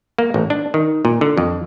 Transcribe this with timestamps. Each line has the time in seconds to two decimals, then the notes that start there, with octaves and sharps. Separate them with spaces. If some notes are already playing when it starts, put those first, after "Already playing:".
0.18 A#3
0.34 A1
0.50 D4
0.74 D#3
1.05 A#2
1.21 D3
1.37 F2